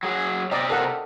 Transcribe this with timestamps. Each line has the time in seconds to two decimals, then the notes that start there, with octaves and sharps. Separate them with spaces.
0.03 F#3 G#4
0.51 C3 G4 D5 D#5 A#5
0.70 A4 A#4 F#5